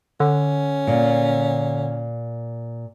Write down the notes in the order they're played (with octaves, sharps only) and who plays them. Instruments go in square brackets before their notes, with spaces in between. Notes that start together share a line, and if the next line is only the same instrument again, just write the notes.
[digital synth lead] D3 [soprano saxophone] C#4
[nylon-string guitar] A#2